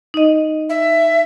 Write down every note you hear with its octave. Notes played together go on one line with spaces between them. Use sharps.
D#4 D#5
E5